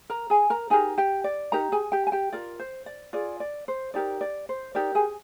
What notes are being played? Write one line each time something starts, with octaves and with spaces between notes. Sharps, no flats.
A#4 A#5
G#4 G#5
A#4 A#5
D#4 G4 G#4 A#4 G#5
G4 G5
D5
D#4 G4 A#4 A#5
G#4 G#5
G4 G5
G#5
G4 G5
F4 A#4 D5
C5
D5
F4 G#4 D5
D5
C5
D#4 G4 A#4 D5
D5
C5
D#4 G4 A#4 D5
G#4 G#5